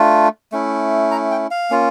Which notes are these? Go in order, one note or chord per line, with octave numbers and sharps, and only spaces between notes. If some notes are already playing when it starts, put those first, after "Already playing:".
Already playing: A3 D4 F4
A3 C#4 E4
A#5
G5
F5
A#3 C#4 F4